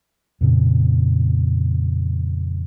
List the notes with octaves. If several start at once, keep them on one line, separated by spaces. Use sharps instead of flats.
F2 A#2 C#3